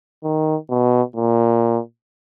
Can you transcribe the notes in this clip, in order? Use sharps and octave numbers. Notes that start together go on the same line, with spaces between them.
D#3
B2
A#2